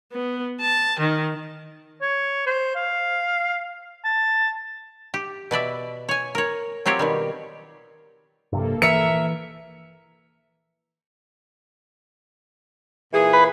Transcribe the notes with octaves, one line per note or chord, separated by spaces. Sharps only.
B3
A5
D#3
C#5
C5
F5
A5
G4
B2 B4 D5 E5
C#5 G#5
A#4 C#5
F#3 C4 F4 G4 C#5
B2 D#3 G3
A#1 G2 C3 A#3 A4
E3 A#4 E5 C#7
A#2 E3 G#4
B4